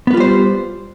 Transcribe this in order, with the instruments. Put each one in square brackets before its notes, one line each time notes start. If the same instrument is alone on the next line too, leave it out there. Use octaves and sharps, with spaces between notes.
[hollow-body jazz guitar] B3
B4
F4
G3
C5